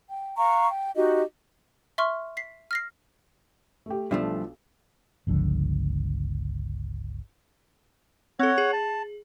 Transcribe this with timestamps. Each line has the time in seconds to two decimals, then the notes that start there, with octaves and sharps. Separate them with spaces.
0.09 G5
0.37 F5 F#5 A#5 C#6
0.69 G5
0.95 D#4 F#4 G4 D#5
1.98 E5 C6 C#6 F6
2.37 B6 C7
2.71 F6 A#6 C7
3.86 A3 G4
4.11 B1 G2 F3 A3 D4
5.27 G1 C#2 D3 F3
8.39 C4 A4 C#5 F#5
8.58 G#4
8.73 A5